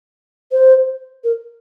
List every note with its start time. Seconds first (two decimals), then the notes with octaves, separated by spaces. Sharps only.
0.52 C5
1.24 A#4